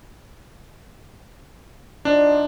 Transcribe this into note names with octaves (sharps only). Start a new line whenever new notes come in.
F3 D4 D#4 D5